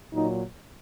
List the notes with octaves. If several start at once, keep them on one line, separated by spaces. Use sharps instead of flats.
A#2 F#3 D#4